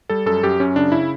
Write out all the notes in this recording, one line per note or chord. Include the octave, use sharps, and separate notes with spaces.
G3 A4
F#2 A4
F#2 G4
F#2 C#4
C#3 D4
C#3 E4